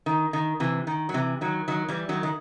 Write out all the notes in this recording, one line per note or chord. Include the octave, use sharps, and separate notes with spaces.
D#3
D#3
C3 E3
D#3
F#3
C3 E3
D#3 F#3
D#3 F#3
E3 G3
D#3 F#3
D#3